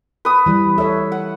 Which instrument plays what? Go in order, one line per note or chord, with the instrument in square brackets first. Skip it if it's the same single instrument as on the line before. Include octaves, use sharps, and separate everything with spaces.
[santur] B4 D#6
[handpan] E3 G3
[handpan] A4 C#5 [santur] E5
[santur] F#5